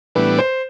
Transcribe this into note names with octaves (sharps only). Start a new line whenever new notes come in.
A2 E3 G3 B3 D4 B4
C5